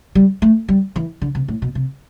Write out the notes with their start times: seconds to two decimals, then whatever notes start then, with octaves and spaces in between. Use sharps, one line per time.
0.15 G3
0.42 A3
0.68 G3
0.96 E3
1.22 D3
1.35 C3
1.48 A2
1.62 B2
1.75 C3